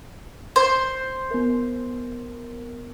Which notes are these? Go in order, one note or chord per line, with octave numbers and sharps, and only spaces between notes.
C5
B3 A#4